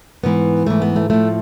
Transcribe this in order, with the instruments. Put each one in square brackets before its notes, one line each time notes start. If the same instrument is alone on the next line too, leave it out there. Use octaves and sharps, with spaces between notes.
[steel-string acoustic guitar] G#2 E3 B3
G#2 E3 A3
B3
A3
A2 F3 A3